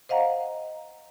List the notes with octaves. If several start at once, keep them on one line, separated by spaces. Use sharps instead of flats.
C5 D#5 F5 F#5 A#5